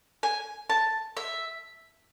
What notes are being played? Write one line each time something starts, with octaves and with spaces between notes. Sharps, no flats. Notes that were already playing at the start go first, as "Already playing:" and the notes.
G#5
A5
E5